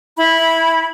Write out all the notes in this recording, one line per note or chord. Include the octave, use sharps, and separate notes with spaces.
E4 B5